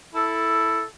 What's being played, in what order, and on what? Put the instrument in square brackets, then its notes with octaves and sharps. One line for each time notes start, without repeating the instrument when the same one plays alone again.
[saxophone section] E4 A4